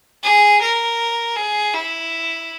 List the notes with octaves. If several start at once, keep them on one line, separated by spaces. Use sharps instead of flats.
G#4
A#4
G#4
E4